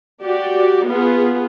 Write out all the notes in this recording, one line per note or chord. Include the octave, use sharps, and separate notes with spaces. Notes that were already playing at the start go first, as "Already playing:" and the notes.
F#4 G4 D5
B3 F4 G#4